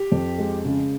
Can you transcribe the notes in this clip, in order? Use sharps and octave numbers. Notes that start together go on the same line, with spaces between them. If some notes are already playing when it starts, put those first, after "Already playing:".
Already playing: G4
F2
G#3
C#3